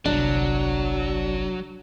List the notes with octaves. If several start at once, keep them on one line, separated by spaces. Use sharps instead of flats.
G1 C2 F#3 D4